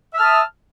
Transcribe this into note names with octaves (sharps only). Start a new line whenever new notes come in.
E5 A5 D#6 F6